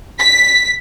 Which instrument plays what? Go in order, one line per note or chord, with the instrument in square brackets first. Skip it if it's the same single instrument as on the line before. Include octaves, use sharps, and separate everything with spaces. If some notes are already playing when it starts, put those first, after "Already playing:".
[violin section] B6